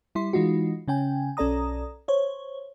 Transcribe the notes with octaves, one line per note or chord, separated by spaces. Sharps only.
G3 E4 C6
E3 G#3 D#4 F4 F#4
C#3 C#4 G5 G#5
B1 C#4 A4 D5 A#5 D#6
C5 C#5